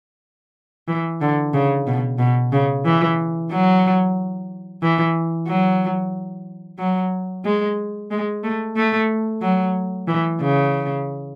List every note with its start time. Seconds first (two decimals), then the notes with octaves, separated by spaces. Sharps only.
0.88 E3
1.21 D3
1.54 C#3
1.87 B2
2.19 B2
2.52 C#3
2.85 E3
3.51 F#3
4.82 E3
5.47 F#3
6.79 F#3
7.45 G#3
8.11 G#3
8.43 A3
8.76 A3
9.42 F#3
10.08 E3
10.41 C#3